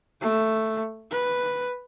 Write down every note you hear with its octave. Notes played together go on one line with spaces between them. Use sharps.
A3
B4